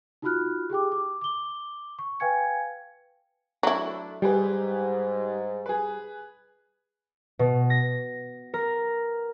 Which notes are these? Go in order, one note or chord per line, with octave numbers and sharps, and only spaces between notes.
D#4 F4 F#4 B5 F6 F#6
G4 G#4 G5 D6
D6
D6 G7
C#6
B4 F5 G5 G#5 G#6 C#7
F#3 A3 D4 E4
G#2 G3 G4 G#4 B4
G#4 B4
B2
A#6
A#4